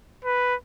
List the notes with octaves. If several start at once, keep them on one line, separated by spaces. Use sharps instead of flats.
B4